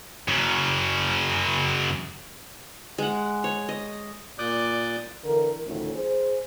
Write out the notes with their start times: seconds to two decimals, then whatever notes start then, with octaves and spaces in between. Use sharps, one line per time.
0.28 F#2 C#3
2.98 G#3 F#5
3.44 C#5
3.69 D#5
4.39 A#2 D5 D6 D#6 F#6 G6
5.25 D3 E3 A#4
5.66 D2 A2 D#3 F3 C#4
5.95 G#4 C5